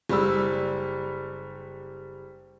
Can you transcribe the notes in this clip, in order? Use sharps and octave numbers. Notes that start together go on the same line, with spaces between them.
F#1 G3 E6